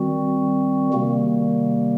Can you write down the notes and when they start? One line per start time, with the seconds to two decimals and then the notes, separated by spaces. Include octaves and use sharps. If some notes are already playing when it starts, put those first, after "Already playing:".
Already playing: D#3 G3 C4 F#4
0.93 C3 D#3 G3 A#3